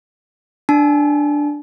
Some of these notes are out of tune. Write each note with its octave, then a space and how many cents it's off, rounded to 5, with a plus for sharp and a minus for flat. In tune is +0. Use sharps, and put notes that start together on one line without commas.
D4 +0 A5 -40